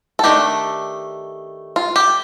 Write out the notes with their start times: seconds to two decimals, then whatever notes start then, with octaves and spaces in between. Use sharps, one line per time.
0.19 A4
0.24 D#3 A3 D4 G4
1.76 F4
1.96 G4